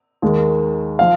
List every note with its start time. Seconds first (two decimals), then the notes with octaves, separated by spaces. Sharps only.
0.22 D#2 D#3 G#3
0.99 F3 F5